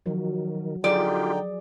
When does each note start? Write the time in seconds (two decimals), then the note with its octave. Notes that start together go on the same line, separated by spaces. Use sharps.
0.06 D#3 F3 F#3 F#4
0.84 D3 F#3 D#4 F4 G4 G#4 D5 G5